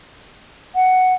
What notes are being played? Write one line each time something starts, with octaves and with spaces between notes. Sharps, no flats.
F#5